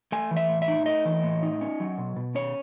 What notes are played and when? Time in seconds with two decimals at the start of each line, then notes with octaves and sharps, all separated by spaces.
0.12 A3 G#5
0.31 E3
0.37 E5
0.49 A2
0.62 E5
0.68 D#4
0.86 A3 D#5
1.05 E3
1.23 A2
1.43 D#4
1.61 C#4
1.80 F#3
1.98 B2
2.16 B2
2.35 C#4 C#5